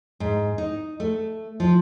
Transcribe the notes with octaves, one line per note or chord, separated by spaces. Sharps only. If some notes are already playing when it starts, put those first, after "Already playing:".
G#2
D#4
A3
F3